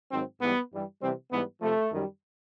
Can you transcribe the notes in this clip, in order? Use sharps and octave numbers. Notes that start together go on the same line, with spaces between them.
G#2 D#3 F#3 C4
G#2 E3 G3 B3
G2 E3 G3
C3 E3 G3 C4
G#2 E3 G3 B3
C3 F3 A3
F#2 D#3 G3